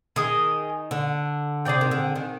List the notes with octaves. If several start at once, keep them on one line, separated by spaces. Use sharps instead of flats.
D#3 G#4 D#5 G#5
D3
C3 G#4 D5 G5
D#3
D3
D#3